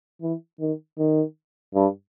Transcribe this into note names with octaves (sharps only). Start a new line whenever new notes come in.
E3
D#3
D#3
G2